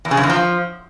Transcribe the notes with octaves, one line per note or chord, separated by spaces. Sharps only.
E2
C#3
F#2
E2
F3